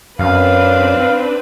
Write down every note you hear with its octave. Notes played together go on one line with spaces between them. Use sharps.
F#2 C4 D4 B4 F5